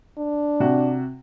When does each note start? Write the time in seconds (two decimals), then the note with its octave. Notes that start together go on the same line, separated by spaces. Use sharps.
0.18 D4
0.60 C3 F#4